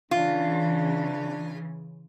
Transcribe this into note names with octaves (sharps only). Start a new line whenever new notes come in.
C#3 E3 D4 F4